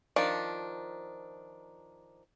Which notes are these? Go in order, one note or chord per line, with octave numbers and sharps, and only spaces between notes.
D#3 F3 D4